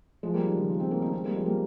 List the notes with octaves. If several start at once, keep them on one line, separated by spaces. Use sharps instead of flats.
F3 G#3
G3 A#3
D#3 G3
C#3 F3
A#3
G#3 C4
A#3 C#4
C4 D#4
G#3 C4
G3 A#3
F3 G#3
G3 A#3